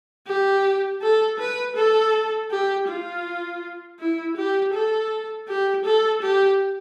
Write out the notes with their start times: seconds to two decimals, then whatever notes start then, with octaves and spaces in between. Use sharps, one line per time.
0.27 G4
1.02 A4
1.39 B4
1.76 A4
2.51 G4
2.88 F4
4.00 E4
4.36 G4
4.74 A4
5.48 G4
5.85 A4
6.22 G4